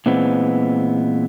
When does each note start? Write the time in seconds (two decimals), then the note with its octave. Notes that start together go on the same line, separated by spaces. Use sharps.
0.06 A#2 E3 G#3 B3 C4